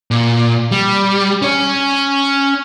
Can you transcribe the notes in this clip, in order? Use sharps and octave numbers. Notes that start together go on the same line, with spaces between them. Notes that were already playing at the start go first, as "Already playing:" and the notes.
A#2
G3
C#4 C#5